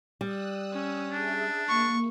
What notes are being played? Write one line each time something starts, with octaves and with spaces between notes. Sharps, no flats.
G3 D#6 E6 F#6
C#4
D4 G#4 E5
A#3 C#6